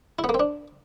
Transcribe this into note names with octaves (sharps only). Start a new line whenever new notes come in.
E4
B3
A#3
C4
D4